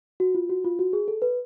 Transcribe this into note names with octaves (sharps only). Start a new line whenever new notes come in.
F#4
F4
F#4
F4
F#4
G#4
A4
B4